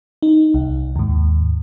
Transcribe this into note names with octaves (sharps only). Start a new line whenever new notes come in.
D#4
C2
D#2 G#2